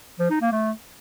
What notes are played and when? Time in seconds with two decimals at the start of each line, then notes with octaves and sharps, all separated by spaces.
0.19 F3
0.31 D#4
0.42 A#3
0.53 A3